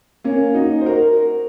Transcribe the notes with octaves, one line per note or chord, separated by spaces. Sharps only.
A#3 C#4
D#4 F#4
C5
F#4 A#4